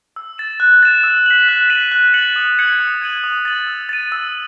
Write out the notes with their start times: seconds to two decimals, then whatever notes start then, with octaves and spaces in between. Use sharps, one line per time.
0.16 E6
0.38 A6 E7
0.60 F#6
0.83 A6 E7
1.03 E6
1.26 B6 F#7
1.49 F#6
1.70 B6 D#7 F#7
1.92 F#6
2.14 A6 C#7 F#7
2.36 D#6
2.58 G#6 C#7 F#7
2.80 D#6
3.01 G#6 D#7 F#7
3.24 D#6
3.45 A6 D#7 F#7
3.67 E6
3.89 A6 D#7
4.12 E6